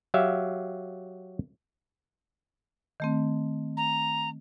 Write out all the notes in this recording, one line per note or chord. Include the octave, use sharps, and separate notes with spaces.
F#3 G4 E5 F5
D#3 A3 C4
A#5